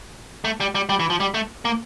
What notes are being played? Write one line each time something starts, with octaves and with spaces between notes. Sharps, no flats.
A3
G3
G3
G3
E3
F3
G3
A3
A#3